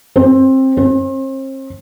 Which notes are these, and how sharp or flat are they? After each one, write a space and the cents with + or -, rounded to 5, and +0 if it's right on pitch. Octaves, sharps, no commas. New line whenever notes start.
C4 +20
C4 +40